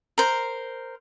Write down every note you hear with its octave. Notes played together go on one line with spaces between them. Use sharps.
A#4 C5